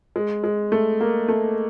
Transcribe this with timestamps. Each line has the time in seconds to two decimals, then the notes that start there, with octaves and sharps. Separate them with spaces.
0.16 G#3
0.44 G#3
0.72 A3
1.01 A#3
1.28 A3